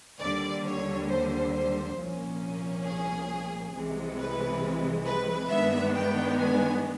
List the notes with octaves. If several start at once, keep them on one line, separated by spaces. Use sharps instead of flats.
D#2 D3 G3 D5
C#5
C5
C5
C2 A#2 F3 A#3 C#4
G#4
C2 C3 E3 G#3
B4
B4
G2 D#3 G#3 B3 D4 E5
G5
G#5